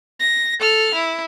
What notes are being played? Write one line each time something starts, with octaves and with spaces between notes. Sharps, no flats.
A#6
A4 F6
E4